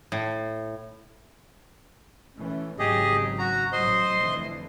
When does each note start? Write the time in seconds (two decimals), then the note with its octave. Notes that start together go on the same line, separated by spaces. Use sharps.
0.12 A2
2.38 E3 A3 C#4
2.79 G#1 C#3 F#3 G4 G#4 D#5
3.38 F#4 A#5
3.72 A1 F#3 C5 D#5 C6
4.17 F1 D3 E3